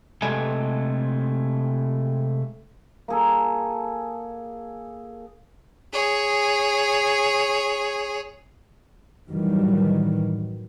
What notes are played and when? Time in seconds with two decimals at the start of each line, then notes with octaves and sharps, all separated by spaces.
0.22 C3 G#3 A3 A4 D#5 G#5
3.08 A#3 G#4 A4
5.93 G#4 C#5
9.28 F#2 A2 D#3 E3 F#3 G3